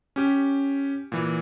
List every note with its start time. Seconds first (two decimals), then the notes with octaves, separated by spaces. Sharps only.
0.16 C#4 G4
1.12 A#2 E3